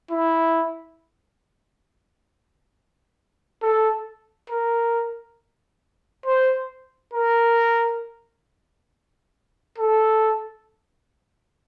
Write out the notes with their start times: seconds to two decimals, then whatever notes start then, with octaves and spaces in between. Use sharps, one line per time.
0.11 E4
3.62 A4
4.50 A#4
6.26 C5
7.14 A#4
9.78 A4